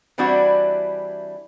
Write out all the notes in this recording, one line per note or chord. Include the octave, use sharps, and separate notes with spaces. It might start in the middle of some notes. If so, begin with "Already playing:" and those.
E3 G3 C4 D4 E4 F#4